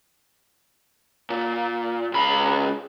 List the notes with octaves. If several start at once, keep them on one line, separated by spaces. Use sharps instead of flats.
A#2
C#2 B5